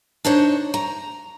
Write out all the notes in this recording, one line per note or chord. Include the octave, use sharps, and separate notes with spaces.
D4 D#4 C5 C#5
A#5